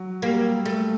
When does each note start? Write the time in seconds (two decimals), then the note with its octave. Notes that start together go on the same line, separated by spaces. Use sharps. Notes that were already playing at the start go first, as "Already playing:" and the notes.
Already playing: F#3
0.22 G3 A#3
0.66 A3